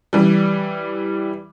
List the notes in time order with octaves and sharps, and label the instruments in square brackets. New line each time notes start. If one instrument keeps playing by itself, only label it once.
[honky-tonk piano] E3 G3